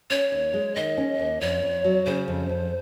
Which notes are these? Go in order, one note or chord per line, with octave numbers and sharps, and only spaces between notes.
C#4 C#5
D#2
G#3
D#3 D#5
C#4
D#2
F2 C#5
F2
F#3
C#3 C5
F2
F2